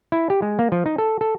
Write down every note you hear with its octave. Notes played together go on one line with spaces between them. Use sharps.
E4
G4
G#3
A#3
F3
D#4
A4
A4